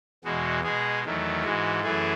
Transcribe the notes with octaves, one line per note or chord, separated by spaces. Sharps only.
E2 B2 G#3 F#4
B2 G#3 G#4
E2 D#3 F#3 A3
G#2 E3 G#3 F#4
F#2 E3 A3 G#4